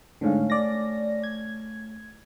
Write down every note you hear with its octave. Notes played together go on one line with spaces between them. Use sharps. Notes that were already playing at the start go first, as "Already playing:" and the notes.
G#2 D3 A3 C#4 F5
D5 A#6
G#6